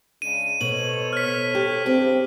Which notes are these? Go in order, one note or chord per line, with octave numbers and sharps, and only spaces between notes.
C#3 G#3 D4 D#7
B2 A4 C5 C#5 F#7
F6 B6
G4
G2 C#3 C4 D4 G4